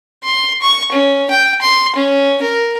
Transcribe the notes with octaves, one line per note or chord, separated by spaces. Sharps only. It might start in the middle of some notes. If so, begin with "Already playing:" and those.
C6
C#6
C#4
G5
C6
C#4
A#4